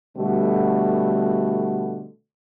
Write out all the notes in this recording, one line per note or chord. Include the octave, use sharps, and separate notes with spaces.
B2 D3 G3 A3 F#4